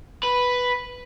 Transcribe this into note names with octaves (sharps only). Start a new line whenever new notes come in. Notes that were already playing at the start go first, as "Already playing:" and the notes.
B4